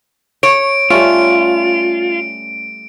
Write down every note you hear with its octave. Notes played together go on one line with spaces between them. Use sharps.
C#5 D7
G3 A3 C#4 F4 D7